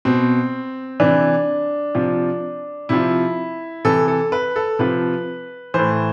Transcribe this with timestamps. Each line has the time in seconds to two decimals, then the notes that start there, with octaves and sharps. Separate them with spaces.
0.05 B2 C4
1.00 C3 E3 D4
1.95 C3 F3
2.89 C3 F3 E4
3.85 C3 E3 A4
4.08 A4
4.32 B4
4.56 A4
4.79 C3 F3 B4
5.74 A2 E3 C5